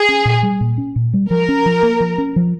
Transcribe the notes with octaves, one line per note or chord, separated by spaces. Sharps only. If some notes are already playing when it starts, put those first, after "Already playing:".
Already playing: G#4
C#4
A#2
G3
A#2
C#4
A#2
G3
F3 A#4
C#4
F3
A#3
F3
C#4
F3